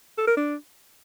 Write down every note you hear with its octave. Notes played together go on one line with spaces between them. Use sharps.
A4
A#4
D4